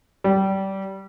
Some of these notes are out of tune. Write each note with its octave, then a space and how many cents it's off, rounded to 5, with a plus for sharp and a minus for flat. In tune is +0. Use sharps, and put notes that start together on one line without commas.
G3 -20